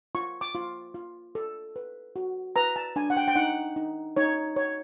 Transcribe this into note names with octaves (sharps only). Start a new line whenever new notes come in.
F4 C#6
D6
F4
F4
A4
B4
F#4
B4 A#5
A5
D4 G#5
F#5
G5
G5
D#4 F#5
D#4
D#4 C#5
C#5